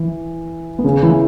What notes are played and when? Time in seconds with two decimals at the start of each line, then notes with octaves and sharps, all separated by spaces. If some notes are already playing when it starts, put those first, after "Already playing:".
Already playing: E3
0.79 B3
0.84 C#3 C#4
1.03 E3 E4